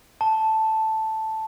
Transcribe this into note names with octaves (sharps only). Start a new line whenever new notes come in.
A5